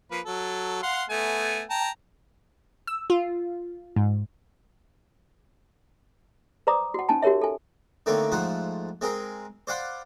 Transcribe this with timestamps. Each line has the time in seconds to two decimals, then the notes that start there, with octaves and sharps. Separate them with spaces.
0.11 F3 A#3 B4
0.25 F#3 A4
0.83 F5 F#5 C6
1.09 A3 B3 G#5
1.70 G5 A5 A#5
2.87 E6
3.10 F4
3.96 G#2
6.67 B4 C5 D5 A#5 D6 D#6
6.94 F#4 F#5
7.09 C#4 D#4 G#5 A5
7.22 F#4 G4 A#4 C#5 E5
7.41 A4 G#5
8.06 D3 D#3 A3 A#3 C4 C#5
8.32 G#2 F3 A3 F4 F#5
9.01 G#3 C4 G#4 A#4
9.67 C5 D5 F5 F#5 B5 C6